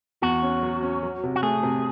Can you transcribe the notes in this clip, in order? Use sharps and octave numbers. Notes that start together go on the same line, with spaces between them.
E2 F#4
C#4
F#3
C#4
F#3
C3
F#4
A3 G#4
C3